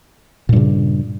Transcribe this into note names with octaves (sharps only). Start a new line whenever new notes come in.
G2 A#2 C#3